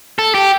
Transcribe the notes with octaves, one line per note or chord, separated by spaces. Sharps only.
A4
G4